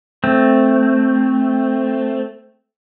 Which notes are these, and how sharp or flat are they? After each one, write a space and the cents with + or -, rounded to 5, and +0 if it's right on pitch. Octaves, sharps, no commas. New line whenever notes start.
A3 +0 C4 +0